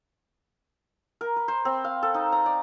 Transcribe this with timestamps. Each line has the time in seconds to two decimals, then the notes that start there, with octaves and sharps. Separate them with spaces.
1.21 A#4
1.36 B4
1.48 C5
1.65 C4
1.84 F5
2.03 A4
2.14 D#4
2.32 A#5
2.46 D5